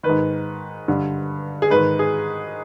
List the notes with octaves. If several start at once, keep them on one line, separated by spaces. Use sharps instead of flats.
D#3 B4
G#2
G2 D3
G#4
G#2 D#3 B4
G#4